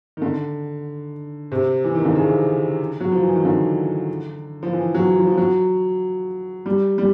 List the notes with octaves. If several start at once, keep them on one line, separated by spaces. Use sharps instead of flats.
D#3
D3
C3
E3
D#3
D3
C#3
F#3
F3
E3
D#3
D3
F3
E3
F#3
F3
F3
F#3
G3
G3